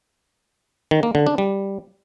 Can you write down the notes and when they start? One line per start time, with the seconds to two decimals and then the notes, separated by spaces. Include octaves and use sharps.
0.91 D#3
1.03 A#3
1.15 D3
1.27 D4
1.38 G3